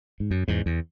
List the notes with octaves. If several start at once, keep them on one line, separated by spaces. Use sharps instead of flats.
G#2
F#2
E2 G#2
E2